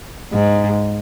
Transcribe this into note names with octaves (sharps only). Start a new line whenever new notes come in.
G#2